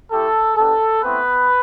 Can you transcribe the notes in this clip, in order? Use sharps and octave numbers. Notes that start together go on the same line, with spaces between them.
A3 E4 G4 A4
B3 D4 G4 A4
A3 B3 C4 E4 B4